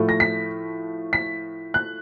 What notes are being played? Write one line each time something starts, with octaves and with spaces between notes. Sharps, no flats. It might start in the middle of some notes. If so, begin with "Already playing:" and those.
Already playing: A2 F3 A3
A#6
B6
B6
F#6